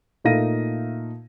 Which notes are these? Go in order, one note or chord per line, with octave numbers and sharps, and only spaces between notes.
A#2 A3 D#4 F5 A#6 D#7